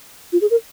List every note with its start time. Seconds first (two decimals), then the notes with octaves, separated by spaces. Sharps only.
0.33 F4
0.41 G#4
0.51 A#4